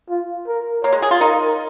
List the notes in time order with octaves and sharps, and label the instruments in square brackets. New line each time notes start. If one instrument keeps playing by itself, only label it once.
[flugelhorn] F4
A#4
[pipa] A#3 [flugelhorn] C#5
[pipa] G#3
G#4
F4
[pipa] D#4 [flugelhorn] A#4